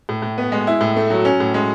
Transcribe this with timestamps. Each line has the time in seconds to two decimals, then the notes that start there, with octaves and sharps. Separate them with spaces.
0.09 A2
0.22 A2
0.38 B3
0.52 G#3
0.67 E4
0.81 A2
0.96 A3
1.10 F#3
1.25 C#4
1.40 A2
1.54 G#3